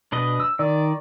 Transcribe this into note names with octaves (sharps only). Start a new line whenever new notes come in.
B2 D4 B4 D#5
E6
D#3 D5